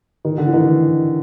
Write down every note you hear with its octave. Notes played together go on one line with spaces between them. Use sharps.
D#3
D3
E3
D#3